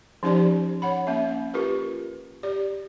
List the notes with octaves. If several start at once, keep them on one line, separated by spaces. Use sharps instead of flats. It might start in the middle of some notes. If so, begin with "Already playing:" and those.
F3 C#4 D#4 G4 C5 D5
C#5 F#5 B5
A#3 C#4 E5
F4 G4 A#4 B4
G4 D5